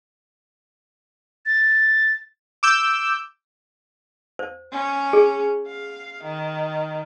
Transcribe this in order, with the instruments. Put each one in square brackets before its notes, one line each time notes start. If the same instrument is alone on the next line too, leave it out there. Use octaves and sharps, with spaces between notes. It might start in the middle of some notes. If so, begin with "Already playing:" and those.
[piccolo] A6
[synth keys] D6 E6 G6
[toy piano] C5
[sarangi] C#4
[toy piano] G#4
[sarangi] F5
D#3